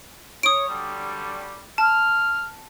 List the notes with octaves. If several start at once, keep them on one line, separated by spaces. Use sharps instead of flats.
C#5 D#6 D7
D3 F#3 G3
A5 F6